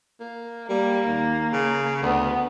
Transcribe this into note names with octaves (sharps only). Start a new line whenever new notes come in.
A#3
G3 A#3
D#2
C#3
D2 B3